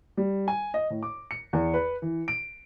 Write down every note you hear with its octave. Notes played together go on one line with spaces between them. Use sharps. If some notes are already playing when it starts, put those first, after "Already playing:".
G3
G#5
D#5
A2
D6
C#7
E2
B4
E3
D7